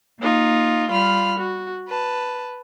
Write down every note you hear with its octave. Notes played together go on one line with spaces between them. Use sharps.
A#3 D#4 F4
G3 F4 B5 F6
F#4
B4 A5